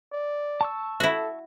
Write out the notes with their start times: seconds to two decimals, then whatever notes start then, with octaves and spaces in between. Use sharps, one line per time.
0.12 D5
0.61 A5 C#6 E6
1.00 E4 F#4 A4